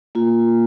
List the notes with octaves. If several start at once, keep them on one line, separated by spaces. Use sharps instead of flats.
A#3 F4